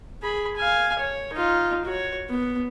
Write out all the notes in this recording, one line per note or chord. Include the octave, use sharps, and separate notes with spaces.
G#4 B5
F5 G#5
C#5
D#4 F4
F#4 C#5
B3